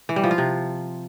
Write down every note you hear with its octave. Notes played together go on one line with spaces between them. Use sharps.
E3
G3
F3
F4
C3